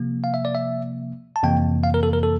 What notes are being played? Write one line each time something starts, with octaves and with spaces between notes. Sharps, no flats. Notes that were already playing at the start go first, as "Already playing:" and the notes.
Already playing: C3 F3 A#3
F5
E5
D5
E5
A5
F2 C3 E3 A#3 G5
F5
A#4
A4
A#4
A4